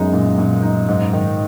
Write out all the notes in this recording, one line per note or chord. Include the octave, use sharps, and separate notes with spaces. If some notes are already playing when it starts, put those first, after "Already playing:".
Already playing: F#2 G#3 B3 D#4
A#2
A#2
D#4
G#2
D#3